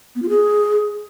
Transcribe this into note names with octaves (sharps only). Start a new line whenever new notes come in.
B3
F4
G#4